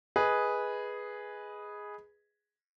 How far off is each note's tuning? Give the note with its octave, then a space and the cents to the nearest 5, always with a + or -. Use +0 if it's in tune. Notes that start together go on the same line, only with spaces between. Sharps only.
G#4 +0 B4 -5 D#5 +15